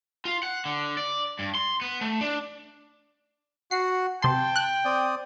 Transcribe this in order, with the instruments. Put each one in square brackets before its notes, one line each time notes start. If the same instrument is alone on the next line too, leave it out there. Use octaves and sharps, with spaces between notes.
[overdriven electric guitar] F4
F#5
D3
D5
G2
C6
B3
A3
D4
[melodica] F#4 F#5 [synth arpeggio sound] C7
[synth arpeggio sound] C3 C6 [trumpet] G5 [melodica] A5
[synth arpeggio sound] F#6
[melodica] C4 D5 D#6